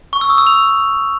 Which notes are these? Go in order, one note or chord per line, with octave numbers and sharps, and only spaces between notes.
C#6
E6
D#6
E6
F7